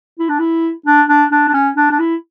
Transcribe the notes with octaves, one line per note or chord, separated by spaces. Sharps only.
E4
D4
E4
D4
D4
D4
D4
C#4
D4
D4
E4